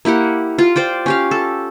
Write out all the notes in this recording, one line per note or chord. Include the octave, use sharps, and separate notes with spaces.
A#3 E4 G4 F#5
F4
C5 D5 G5
C#4 G4 F5
A4